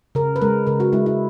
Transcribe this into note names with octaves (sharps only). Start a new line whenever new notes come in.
C#3 A#4
B4
G#3 A#4
C#3 A#4
F#4
G#3 E4
E4